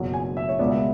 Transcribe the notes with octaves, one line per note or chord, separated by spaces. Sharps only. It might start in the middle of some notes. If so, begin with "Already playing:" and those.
Already playing: F#1 E2 B2 F#3
G#5
E5
C#5
C#2 B2 G#3 B3 D5
E5